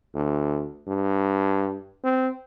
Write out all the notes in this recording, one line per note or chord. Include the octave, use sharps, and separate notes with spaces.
D2
G2
C4